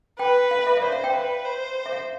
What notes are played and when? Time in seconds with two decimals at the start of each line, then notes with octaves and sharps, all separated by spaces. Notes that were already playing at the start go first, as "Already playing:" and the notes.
0.19 B4 G5
0.51 F5
0.67 E5
0.77 E5
0.82 C5 D5
0.92 F5
1.04 G5
1.14 B4
1.45 C5
1.86 E5
1.92 F5